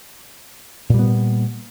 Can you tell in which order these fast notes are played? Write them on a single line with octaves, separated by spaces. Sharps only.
A#2 G3 B3